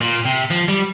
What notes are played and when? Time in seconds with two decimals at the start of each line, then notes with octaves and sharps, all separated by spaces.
0.01 A#2
0.25 C3
0.51 F3
0.68 G3